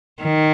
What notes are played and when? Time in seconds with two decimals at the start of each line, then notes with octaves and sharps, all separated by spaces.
0.23 D#3